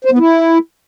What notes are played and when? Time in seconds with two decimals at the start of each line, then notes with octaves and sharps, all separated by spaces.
0.05 C5
0.12 B3
0.19 E4